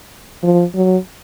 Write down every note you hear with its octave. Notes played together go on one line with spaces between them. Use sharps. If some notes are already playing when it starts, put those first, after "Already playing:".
F3
F#3